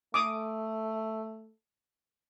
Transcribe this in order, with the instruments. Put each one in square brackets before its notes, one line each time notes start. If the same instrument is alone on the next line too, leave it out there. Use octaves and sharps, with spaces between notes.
[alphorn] A3 [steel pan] D6 D#6